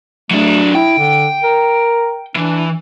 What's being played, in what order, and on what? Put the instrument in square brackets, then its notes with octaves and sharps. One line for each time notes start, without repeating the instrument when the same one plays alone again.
[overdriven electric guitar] F#3 D4 [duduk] A3
[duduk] E4 [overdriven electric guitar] G5
[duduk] D3
A#4
[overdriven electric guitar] E3 [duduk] D4